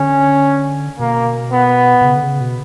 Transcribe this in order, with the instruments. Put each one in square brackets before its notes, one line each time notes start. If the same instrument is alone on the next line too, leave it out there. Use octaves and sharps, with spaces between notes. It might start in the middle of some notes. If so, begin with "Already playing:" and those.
Already playing: [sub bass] D3 [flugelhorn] C#4
[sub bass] B2 [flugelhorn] A#3
[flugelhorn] B3
[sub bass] B2
C#3
D3
C#3
B2